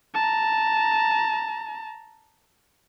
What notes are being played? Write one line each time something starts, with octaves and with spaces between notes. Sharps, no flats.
A5 A#5